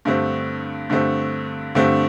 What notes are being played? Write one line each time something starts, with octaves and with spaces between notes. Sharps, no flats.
G2 D3 A3 C4
G2 D3 A3 C4
G2 D3 A3 C4